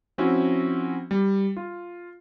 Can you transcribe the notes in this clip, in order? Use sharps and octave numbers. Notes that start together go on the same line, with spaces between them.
F3 C4 C#4 E4 F#4
G3
F4